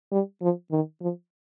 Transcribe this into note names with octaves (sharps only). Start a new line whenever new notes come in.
G3
F3
D#3
F3